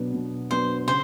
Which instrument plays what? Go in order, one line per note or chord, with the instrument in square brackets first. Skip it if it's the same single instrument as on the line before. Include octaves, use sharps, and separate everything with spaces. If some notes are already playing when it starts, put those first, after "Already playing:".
Already playing: [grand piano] B2 F#3 B3 D4
B2
[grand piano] F#3 B3 D4 [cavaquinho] C5
[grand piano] C#3 [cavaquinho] C5